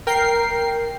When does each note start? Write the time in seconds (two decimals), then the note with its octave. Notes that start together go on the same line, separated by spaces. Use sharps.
0.07 A#4 G5 C7